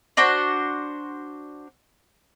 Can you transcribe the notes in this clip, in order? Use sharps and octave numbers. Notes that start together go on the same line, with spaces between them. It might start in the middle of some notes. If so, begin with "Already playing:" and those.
D4 F#4 C5